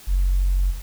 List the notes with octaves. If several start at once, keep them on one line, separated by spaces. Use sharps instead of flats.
F#1